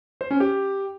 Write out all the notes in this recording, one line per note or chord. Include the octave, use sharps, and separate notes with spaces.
C5
C#4
G4